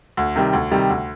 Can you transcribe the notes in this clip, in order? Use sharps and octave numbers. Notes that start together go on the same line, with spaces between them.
D2
C3 D#3 G3
D2
C3 D#3 G3
D2